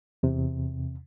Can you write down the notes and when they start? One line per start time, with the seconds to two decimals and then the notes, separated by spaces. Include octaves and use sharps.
0.23 E2 C3